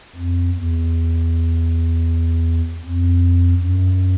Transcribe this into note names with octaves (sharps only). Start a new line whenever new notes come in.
F2
E2
F2
F#2